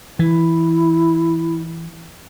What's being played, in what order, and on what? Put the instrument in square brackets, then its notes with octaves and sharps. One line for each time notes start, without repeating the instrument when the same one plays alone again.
[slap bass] E3 [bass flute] E4